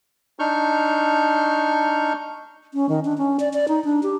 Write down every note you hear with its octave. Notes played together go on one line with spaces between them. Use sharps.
D4 D#4 C#6 F6 G6
C#4
D#3
D4
C#4
D5
D5
D#4
D4
G4